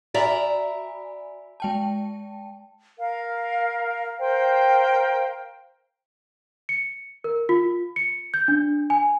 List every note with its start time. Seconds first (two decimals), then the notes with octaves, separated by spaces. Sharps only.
0.14 F#4 D5 E5 G#5 A#5 B5
1.60 G#3 G5 A5
2.98 A#4 F5
4.19 A#4 C5 F5 G5
6.69 C#7
7.24 A#4
7.49 F4
7.96 C#7
8.34 G6
8.48 D4
8.90 G#5